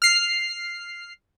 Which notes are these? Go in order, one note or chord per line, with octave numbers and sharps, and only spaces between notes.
F6 C7